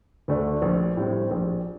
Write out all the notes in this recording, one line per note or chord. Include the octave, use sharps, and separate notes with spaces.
D2 D3 A3 D4
A#1
A2 G3 C4
A#1